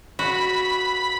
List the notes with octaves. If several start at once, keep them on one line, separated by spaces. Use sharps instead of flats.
F#4 B5